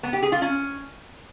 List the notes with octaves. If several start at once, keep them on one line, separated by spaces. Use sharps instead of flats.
B3
G4
G#4
F4
C#4